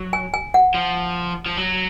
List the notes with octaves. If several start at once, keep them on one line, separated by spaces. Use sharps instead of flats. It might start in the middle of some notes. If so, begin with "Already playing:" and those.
Already playing: F#3
G#5
G#5
F#5
F3
F3
F#3